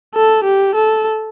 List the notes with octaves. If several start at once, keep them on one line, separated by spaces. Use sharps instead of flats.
A4
G4
A4